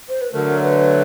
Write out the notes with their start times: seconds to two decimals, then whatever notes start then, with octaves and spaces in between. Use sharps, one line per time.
0.09 C5
0.21 B4
0.33 D3 F#3 A3 A#4
0.61 B4